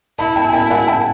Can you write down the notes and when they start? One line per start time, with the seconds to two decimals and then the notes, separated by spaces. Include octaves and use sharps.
0.19 E4 A5 B5
0.36 G5 A5
0.45 G#5
0.53 E4 G5 A5
0.70 F#5 G#5
0.87 G5 A5